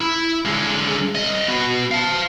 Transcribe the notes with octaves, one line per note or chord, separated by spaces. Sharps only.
E4
D3 G#3
C2 D#5
B3 F#4
F5 A5